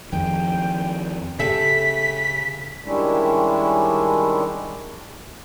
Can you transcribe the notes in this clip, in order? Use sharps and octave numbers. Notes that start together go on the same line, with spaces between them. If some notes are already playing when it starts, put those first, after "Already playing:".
F2 D#3 G5
C#3 G4 A4 E5 B6
D#3 G3 G#3 C#4 D4 E4